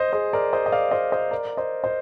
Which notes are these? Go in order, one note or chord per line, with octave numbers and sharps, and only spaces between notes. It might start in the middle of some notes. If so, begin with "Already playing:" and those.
Already playing: C5 D#5
G#4 C5
A#4 D5
C5 D#5
D#5
D5 F5
C5 D#5
C5 D#5
A#4 D5
C5 D#5
C5 D#5